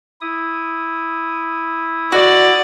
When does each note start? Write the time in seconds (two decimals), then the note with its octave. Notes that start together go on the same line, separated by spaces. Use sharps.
0.21 E4 D#6
2.12 F#4 D5 F#5